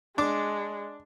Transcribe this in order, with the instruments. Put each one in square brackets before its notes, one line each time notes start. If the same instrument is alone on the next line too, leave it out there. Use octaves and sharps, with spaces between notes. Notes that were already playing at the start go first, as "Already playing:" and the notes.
[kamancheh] G#3 [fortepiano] D4 D6